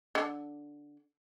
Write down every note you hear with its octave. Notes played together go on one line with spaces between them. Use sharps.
D3